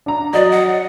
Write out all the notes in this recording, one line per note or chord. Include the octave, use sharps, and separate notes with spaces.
D4 A#5
F#3 F#4 D5 D#5
F#5